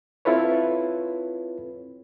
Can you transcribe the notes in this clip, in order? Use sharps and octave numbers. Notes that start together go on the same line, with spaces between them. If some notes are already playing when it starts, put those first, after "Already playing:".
C4 E4 F4 A4 B4 C#5